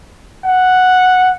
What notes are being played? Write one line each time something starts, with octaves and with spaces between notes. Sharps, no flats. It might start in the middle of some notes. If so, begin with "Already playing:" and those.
F#5